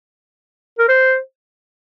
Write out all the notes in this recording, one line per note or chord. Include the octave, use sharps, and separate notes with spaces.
A#4
C5